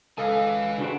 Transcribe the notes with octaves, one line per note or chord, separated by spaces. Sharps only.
C#2 A4 B4 D#5 F5 G#5
C#3 A3 C4 D4 F#4 B4